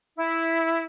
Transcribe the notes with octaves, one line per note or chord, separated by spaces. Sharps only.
E4